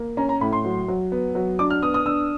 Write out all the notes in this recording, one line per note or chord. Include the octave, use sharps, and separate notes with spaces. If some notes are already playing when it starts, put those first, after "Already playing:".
Already playing: A#3
C#4 A#5
A#5
A2 B5
C6
F#3
F#3
B3
F#3
D4 D6
F6
B3 D#6
D#6
D4 E6